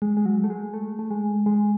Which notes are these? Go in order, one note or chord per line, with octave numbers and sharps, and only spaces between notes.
G#3
G#3
F#3
A3
G#3
A3
A3
G#3
G#3